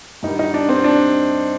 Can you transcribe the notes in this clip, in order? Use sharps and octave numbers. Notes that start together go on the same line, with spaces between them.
G2 D#3 G3 D#4
D#4
D4
C4
D4